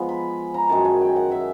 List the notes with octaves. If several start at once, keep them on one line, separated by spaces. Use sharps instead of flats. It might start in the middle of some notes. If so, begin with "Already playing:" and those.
Already playing: F3 G#3 B3
B5
A#5
F#2 D#3 G#3 A5
G#5
G5
F#5
E5